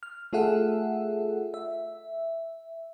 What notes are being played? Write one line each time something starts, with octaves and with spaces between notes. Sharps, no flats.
F6
A3 F4 G#4 A4 E5 F#5
E5